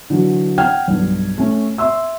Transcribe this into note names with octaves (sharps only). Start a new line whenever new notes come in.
D3 E3 F#3
F#5 G5 F6 G#6
B1 G2
A3 C#4
E5 C6 E6